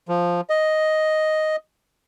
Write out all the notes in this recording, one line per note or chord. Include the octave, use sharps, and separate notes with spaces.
F3
D#5